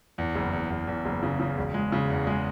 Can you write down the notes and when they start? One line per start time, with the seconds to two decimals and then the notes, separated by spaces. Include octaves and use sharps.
0.18 E2
0.35 F#1
0.53 E2
0.70 E2
0.87 E2
1.05 F#1
1.23 C#3
1.40 C#3
1.58 E1
1.74 G#3
1.92 C#3
2.10 E2
2.27 G#3